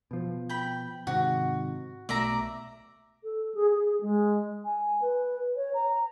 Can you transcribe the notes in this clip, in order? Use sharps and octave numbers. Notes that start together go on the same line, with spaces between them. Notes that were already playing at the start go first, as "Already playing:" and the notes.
B2 F3
G5 B5
G#2 C3 D#3 F#4
B1 B2 A3 D5 E5 A#5
A4
G#4
G#4
G#3
G#5
B4
C#5
A#5